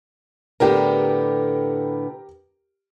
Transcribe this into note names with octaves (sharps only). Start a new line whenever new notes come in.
A2 D3 B3 G4 A#4